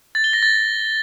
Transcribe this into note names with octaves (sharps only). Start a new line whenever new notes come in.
A6
G7
A#6
A6